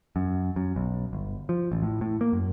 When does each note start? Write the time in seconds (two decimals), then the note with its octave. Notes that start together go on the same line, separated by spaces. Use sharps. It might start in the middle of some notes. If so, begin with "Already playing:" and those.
0.16 F#2
0.56 F#2
0.76 B1
1.13 G1
1.49 F3
1.72 A1
1.83 A2
2.01 A2
2.21 A#3
2.33 F#2